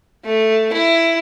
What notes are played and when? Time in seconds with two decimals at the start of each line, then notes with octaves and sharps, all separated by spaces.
0.25 A3
0.73 E4